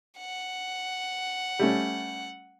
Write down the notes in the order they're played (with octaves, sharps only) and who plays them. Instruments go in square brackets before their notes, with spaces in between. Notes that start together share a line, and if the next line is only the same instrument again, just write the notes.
[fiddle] F#5
[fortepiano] G3 A3 C#4